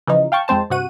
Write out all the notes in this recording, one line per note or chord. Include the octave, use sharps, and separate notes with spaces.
C#3 E3 F3 D#4
F5 G5 A5 C#6
F2 G#3 C4 C5 A5
G2 C3 F#4 F#5 D#7